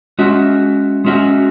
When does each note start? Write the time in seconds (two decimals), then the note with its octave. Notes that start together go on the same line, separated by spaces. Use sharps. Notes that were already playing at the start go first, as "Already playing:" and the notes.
0.18 G#3 C#4 F#4 E5
1.05 G#3 C#4 F#4 E5